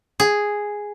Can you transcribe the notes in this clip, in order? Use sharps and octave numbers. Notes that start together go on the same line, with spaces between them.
G#4